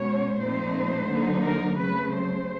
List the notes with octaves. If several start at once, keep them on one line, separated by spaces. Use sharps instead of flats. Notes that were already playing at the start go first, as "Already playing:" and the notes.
Already playing: B2 G#3 C#4 C#5
A#2 F3 A3 C4 D#4 C5
D3 F#3 A#3 D#4
A#4
C#3 F#3 A3 C4 B4
C5